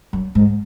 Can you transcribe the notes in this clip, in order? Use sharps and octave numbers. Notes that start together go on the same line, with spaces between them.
F#2
G#2